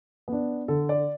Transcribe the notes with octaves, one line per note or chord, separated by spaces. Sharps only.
B3 D4
D3 A4
D5